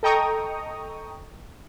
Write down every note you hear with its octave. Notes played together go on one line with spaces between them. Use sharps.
A4 D#5 G5 A#5 C#6 D#6